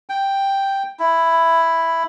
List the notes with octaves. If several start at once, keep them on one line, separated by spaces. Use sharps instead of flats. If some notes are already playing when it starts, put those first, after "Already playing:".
G5
E4